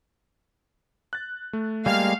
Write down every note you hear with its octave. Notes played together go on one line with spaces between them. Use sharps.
F#6 A6
A3
G3 G#3 A#3 F5